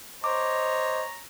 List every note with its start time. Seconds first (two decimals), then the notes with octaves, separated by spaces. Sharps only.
0.24 C5 C#5 D#5 A#5 D6